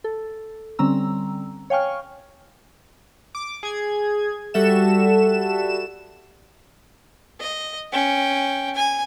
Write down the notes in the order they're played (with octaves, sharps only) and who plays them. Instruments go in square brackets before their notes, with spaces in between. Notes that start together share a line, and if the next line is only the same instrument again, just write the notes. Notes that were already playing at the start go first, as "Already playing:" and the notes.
[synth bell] A4
D3 G3 C4 C#4 A#5 E6
C#5 F5 G5 G#5 C#6 F6
[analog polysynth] D6
G#4 G#6
G3 F#4 A4 E5 E7
[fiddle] D#5
C#4 G5
G#5